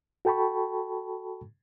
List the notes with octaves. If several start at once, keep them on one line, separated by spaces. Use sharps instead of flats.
F#4 A4 G5 A5 B5 C#6